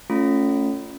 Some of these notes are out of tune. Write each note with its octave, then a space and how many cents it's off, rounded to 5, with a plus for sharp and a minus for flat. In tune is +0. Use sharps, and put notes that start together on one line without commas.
A3 +10 C#4 +0 F4 +0